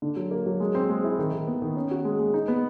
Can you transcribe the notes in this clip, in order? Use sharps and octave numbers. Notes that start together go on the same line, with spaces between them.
D3
F#3
A#3
F#3
G#3
C4
G#3
E4
D#3
D#3
B3
D#3
C#4
F#4
G#3
G#3
D#4
B3